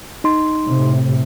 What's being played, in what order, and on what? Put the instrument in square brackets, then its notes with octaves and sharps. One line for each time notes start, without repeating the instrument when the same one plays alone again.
[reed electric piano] D#4 C6
[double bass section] A2 C3